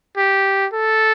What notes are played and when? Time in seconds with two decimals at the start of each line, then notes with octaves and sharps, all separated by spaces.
0.17 G4
0.73 A4